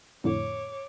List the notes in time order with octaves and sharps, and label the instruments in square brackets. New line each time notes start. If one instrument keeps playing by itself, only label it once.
[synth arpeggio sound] F2 A2 D3 [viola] C#5 D6